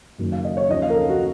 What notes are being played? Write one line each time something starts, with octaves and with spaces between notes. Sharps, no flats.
F#1 F#2 D#3
F5
D#5
C#5
D#2 C#3 F3 D#5
F5
A#4
A4
F#4